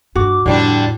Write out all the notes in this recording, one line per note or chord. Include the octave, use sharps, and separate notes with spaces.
G2 F4 F#4 D6
F2 A2 D3 G3 D4